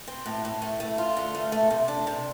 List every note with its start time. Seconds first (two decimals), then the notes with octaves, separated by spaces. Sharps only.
0.08 C4
0.26 A2
0.45 A2
0.62 A3
0.80 A3
0.98 F4
1.17 D3
1.35 A3
1.52 A3
1.70 C3
1.88 D4
2.07 C3